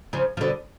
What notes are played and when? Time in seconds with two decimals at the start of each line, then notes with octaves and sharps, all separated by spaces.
0.13 C#3 F3
0.37 F3
0.41 B2 D3